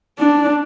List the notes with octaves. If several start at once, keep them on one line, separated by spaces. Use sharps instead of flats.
D4